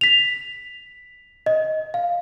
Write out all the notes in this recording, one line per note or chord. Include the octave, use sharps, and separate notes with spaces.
B6 F7
D#5
F5